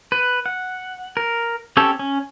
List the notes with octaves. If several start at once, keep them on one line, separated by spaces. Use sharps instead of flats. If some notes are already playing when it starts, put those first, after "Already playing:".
B4
F#5
A#4
C4 C#4 G4 A4 C#5
C#4